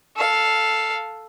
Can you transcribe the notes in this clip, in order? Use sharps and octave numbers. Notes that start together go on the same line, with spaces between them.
A4 F5